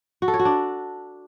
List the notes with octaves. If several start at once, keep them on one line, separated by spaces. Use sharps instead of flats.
F#4
A4
C#5
F#4
D4